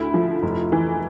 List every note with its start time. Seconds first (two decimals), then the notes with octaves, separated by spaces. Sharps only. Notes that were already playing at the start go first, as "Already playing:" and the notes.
Already playing: D2 E4
0.14 F3
0.42 F1
0.72 E3